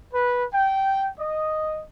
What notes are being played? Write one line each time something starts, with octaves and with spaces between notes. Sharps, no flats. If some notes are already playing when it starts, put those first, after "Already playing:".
B4
G5
D#5